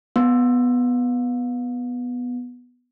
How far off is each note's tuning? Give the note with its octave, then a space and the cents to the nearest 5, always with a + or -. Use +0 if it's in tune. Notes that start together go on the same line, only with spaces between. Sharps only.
B3 +0